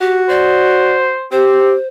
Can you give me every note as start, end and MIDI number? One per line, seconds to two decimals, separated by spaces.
0.01 1.15 66
0.01 0.24 67
0.29 1.27 72
0.29 0.97 74
1.32 1.71 60
1.32 1.74 67
1.32 1.88 72